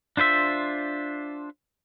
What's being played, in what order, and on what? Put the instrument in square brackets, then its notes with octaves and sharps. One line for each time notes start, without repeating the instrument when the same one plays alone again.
[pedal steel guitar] D4 F4 C5 E5